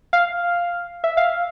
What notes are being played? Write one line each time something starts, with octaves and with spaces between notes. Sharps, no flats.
F5
E5
F5